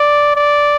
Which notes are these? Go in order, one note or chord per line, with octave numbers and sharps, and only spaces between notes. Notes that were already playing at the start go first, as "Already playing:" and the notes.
Already playing: D5
D5